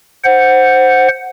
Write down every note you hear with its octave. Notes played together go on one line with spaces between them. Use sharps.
C5 F#5